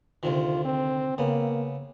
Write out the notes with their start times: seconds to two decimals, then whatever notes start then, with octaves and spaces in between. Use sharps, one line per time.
0.23 D2 C3 D#3 F4
0.65 C4
1.18 C#3 A#3 B3